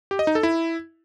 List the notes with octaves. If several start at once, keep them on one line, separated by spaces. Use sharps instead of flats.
G4
D#5
D#4
A4
E4